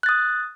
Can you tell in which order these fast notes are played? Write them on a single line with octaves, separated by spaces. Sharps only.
F#6 A6 D#6